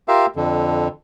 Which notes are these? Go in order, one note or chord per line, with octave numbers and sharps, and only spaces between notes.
F4 G4 A#4 E5 F5
F2 D3